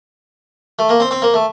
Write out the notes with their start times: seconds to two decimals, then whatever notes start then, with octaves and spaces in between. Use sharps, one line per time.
0.79 A3
0.89 A#3
1.00 C4
1.11 C4
1.22 A#3
1.34 A3